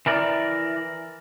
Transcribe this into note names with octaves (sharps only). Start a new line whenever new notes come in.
E3 A#4 D5